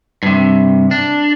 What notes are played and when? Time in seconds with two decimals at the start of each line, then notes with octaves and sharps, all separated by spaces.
0.23 G2 C3
0.91 D4